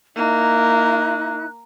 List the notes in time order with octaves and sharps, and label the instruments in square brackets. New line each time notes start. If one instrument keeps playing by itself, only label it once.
[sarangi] A#3 [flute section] D#4 E4 F#6